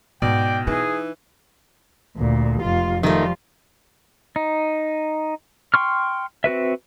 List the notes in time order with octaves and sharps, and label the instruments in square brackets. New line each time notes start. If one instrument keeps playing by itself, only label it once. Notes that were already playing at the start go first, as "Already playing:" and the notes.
[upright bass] G#2 [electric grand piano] B2 [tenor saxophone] D5 [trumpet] G5
[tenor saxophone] E3 [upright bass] D#4 [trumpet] G#4
[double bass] D2 [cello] A#2
[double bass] F1 [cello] F4
[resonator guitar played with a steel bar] D#3 A3 [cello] F3 F4 [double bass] G3
[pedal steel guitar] D#4
G5 C6 C#6 F6
C4 F#4 B4 E5